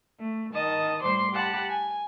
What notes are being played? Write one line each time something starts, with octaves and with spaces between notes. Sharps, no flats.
A3
D#3 D#5 A5 D#6
A2 G3 C5 C6 D6
G4 F#5 A5 B5
G#5